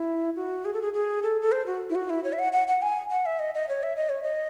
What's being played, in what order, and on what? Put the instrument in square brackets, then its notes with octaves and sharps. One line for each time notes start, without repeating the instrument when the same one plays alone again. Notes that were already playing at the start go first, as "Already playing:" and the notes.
Already playing: [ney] E4
F#4
G#4
A4
G#4
G#4
A4
A4
C5
F#4
E4
F#4
E4
C#5
E5
F#5
F#5
F#5
G#5
F#5
E5
D#5
D#5
C#5
E5
D#5
C#5
D#5